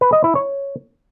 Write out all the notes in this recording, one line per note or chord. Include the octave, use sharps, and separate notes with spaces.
B4
D#5
E4
C#5